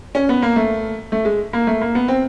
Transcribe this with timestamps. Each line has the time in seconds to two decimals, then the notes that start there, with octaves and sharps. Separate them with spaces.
0.15 C#4
0.29 B3
0.42 A#3
0.56 A3
1.12 A3
1.25 G#3
1.53 A#3
1.67 A3
1.81 A#3
1.95 B3
2.08 C4